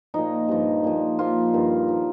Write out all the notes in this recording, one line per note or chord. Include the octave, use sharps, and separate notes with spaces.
A#2 F3 D#4
G2 F3
A#2 F3
A#2 F3 F4
G2 D#3
F3